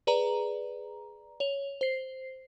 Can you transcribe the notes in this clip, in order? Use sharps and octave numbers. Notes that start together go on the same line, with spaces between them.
G#4 B4 D5 A#5
C#5 F7
C5 C7